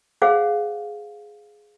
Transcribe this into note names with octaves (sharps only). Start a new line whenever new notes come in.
G#4 C5 F5 F#5